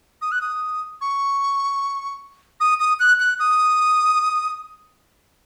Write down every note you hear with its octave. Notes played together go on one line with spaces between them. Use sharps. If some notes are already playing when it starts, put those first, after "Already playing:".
D#6
F#6
D#6
C#6
D#6
D#6
F#6
F#6
D#6